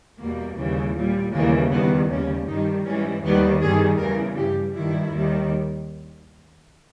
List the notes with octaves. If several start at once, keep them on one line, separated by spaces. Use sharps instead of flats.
E2 B2 G3 A#3
D#2 C#3 E3 G3
A#2 G3
D#2 C#3 E3 G3 A#3
E2 D#3 G3 B3
D#2 C#3 G3 C#4
G2 D#3 G3 D#4
G#2 E3 G3 C#4
D#2 D#3 G3 B3
G2 D#3 G3 G#4
E2 C#3 E3 G3 A#4
G2 G3 G4
G2 D#3 G3 E4
D#2 D#3 G3